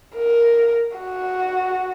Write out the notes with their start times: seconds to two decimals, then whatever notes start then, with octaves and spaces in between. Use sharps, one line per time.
0.16 A#4
0.97 F#4